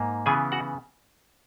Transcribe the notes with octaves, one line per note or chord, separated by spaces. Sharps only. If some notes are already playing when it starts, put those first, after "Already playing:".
Already playing: G#2 A#3
C#3 E3 B3 G#4 G#5
F#4 F#5